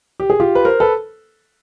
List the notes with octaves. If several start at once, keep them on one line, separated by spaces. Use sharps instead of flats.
G4
G#4
F4 G4
B4
A#4 C5
A4 B4